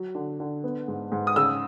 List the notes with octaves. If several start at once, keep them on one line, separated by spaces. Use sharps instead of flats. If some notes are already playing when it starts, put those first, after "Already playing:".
Already playing: F#3
D3
D3
B3
G#2
G#2
D#6
C#3 E6